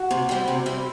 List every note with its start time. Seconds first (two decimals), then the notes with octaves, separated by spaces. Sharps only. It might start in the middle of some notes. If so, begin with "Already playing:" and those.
Already playing: F#4
0.11 C3
0.29 G3 C4 E4
0.48 C3
0.66 G3 C4 E4